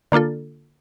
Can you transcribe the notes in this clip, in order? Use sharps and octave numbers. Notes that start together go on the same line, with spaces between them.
D3 A#3 D4 F4 A4